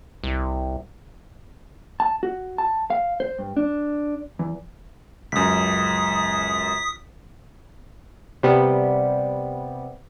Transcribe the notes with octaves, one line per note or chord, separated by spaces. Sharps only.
C2
A5
F#4
A5
F5
C5
G2
D4
E2
C#2 F#2 D#6 B6
C3 G3 B3